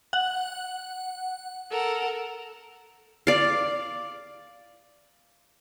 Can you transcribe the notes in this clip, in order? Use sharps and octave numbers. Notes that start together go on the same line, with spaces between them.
F#5
A4 A#4 F#5
D5 F5